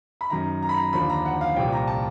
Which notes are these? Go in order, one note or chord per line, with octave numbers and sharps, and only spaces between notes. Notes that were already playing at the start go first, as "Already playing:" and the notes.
B5
F#2 D#3 A#5
A#5
B5
A#5
D#2 D3 F3 B5
A#5
F#5
F5
C2 A#2 F3 G5
A#5
A5